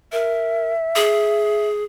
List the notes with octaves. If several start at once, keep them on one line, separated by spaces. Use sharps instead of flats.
A#4 E5
G#4